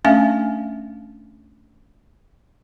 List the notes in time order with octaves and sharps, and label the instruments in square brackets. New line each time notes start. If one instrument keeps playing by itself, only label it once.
[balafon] A3 C#4 D4 E5 F5 G#5